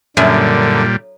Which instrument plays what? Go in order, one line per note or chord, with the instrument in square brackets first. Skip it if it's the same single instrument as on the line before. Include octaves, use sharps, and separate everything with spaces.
[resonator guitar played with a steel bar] F#2 [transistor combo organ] A#2 G3 [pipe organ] D3